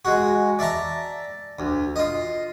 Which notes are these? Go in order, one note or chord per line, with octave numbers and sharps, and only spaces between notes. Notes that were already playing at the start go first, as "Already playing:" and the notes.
G#3 F#4
D5 E5 A5 A#5
D2
F4 D#5